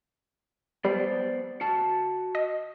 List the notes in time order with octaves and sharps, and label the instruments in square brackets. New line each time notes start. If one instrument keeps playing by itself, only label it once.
[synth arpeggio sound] G3 [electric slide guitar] B3 C5 D5
[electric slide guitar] F#4 A5
[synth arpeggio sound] D#5